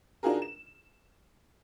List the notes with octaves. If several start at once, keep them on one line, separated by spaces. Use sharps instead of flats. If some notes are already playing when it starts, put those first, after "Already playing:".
D4 D#4 F4 F#4 G#4 A#4
E7